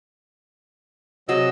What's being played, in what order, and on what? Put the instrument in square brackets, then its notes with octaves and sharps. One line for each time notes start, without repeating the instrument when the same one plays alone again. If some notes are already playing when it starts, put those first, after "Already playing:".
[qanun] C3 F#4 G#4 [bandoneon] F#3 D#5 E6